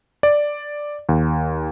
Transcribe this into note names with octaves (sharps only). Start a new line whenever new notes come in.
D5
D#2